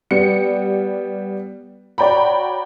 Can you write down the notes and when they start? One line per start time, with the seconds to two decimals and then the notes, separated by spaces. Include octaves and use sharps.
0.11 G3 B3 C#7
1.98 F#4 C#5 D5 G5 A#5 B5